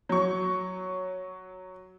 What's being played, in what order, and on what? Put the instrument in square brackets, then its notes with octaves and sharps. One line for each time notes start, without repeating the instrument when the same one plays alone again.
[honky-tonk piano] F#3 C#6